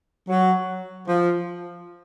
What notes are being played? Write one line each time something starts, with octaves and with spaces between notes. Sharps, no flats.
F#3
F3